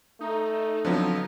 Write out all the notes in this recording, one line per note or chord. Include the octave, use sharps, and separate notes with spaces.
A3 D#4
D3 F3 F#3 B3 C4